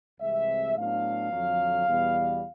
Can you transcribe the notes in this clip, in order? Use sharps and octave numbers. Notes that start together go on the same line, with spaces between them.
C2 C3 E3 G#3 C4 E5
A2 F#3 B3 D4 F5
F2 D3 F#3
E2 B2 G3